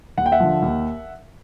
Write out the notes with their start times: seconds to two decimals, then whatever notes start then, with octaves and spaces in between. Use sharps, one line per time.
0.18 D#2 F#5
0.26 G5
0.32 E5 F#5
0.40 D3 F3
0.62 D#2